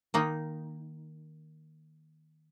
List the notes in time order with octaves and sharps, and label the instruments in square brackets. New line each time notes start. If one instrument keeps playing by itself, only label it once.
[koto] D#3 A#3 D#4